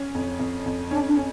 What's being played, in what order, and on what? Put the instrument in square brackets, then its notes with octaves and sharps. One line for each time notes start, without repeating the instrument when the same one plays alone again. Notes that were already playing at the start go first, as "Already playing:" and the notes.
Already playing: [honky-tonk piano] C#4
F2
F2
F2
[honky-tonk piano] C#4 [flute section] D4
[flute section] D4
[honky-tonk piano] C#4